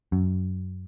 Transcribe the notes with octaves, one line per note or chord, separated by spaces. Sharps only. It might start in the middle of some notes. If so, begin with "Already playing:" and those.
F#2